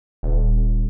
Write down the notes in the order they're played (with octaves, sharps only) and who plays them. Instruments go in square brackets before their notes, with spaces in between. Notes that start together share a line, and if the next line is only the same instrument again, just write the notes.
[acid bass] D#1